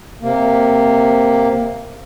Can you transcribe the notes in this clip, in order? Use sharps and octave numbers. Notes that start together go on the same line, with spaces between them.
C3 A#3